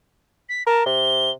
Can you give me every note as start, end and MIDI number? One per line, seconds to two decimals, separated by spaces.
0.49 0.63 95
0.67 0.83 70
0.67 0.84 81
0.86 1.32 48
0.86 1.31 103